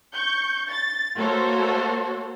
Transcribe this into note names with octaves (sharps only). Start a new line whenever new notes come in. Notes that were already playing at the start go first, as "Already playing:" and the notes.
C#6 G6
A6
A3 A#3 F#4 A4 C5 C#5